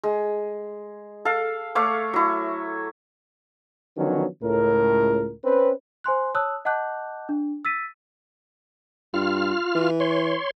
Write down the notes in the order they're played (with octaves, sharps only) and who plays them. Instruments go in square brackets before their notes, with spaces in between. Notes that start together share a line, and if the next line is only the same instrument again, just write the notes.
[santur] G#3
A4 F5
A3 C#5 F5 D6
F#3 E4
[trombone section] D3 D#3 F3 F#3 B3 C#4
C#2 A2 A#4
C4 C#4 B4
[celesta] C5 G#5 C6 F#6
C#5 A5 D#6 E6 F#6
D#5 F#5 A5 D6 F#6 G6
D4
E6 A6 B6 D#7
[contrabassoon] G2 [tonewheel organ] F4 F6
[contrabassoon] E3
[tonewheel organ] C#5 C6